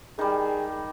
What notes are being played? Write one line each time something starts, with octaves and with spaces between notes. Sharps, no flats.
D#3 G3 G#4